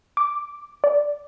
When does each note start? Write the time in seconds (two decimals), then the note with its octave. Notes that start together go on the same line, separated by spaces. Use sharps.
0.17 D6
0.84 D5